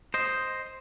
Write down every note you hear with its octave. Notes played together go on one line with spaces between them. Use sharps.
C5 D#5